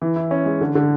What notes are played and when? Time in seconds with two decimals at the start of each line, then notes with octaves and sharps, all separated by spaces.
0.02 E3
0.16 E4
0.31 C#4
0.46 G#3
0.61 D3
0.75 D3